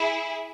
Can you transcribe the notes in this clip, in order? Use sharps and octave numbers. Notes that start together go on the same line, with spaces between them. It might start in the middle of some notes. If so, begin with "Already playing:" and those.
Already playing: E4 G#4